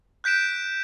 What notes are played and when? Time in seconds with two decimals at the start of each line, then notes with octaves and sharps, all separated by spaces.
0.24 F#6 G6 B6 D7 E7